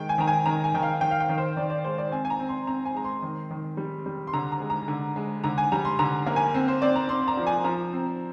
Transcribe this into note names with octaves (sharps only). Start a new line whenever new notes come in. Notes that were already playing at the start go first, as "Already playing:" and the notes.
Already playing: D#3 G#3 G5
G#5
D#3 A#5
G#5
D#3 A#5
G#5
D#3 G5
F5
D#3 G5
F5
G5
D#3
C5
D#3 D5
D5
G#3 C5
D5
C4 G#5
G#5
A#5
C4
C6
C4 A#5
G#5
G#3 A#5
C6
D#3
D#3
G3
G3
C6
D3 A#5
A#5
G#3
A#5
D3
G#3
D3 A#5
G#5
G3 A#5
C6
D3 A#5
A#3
G#5
C4
C5
C4 D5
A#5
C4 C6
A#5
F3
G#5
F3 A#5
C4